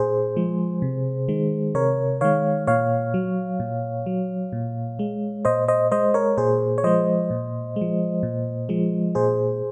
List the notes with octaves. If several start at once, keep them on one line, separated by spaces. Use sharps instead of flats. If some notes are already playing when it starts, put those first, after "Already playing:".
Already playing: A#2 G#4 C5
F3 G#3
C3
D#3 G#3
C3 A#4 C#5
D#3 G#3 C#5 F5
A#2 C#5 F5
F#3
A#2
F#3
A#2
G#3
A#2 C5 D#5
C5 D#5
G#3 C5 D#5
A#4 C#5
A#2 G#4 C5
C#5
F3 G#3 C5 D#5
A#2
G#3
F3
A#2
F3 G#3
A#2 G#4 C5